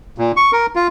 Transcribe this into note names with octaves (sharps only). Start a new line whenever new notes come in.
A#2
C#6
A#4
F4